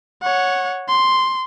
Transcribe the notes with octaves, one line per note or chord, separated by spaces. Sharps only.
C#5 F#5
C6